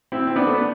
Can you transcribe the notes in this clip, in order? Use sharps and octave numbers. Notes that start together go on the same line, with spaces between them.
C4 E4
C4
B3 D4
A3
B3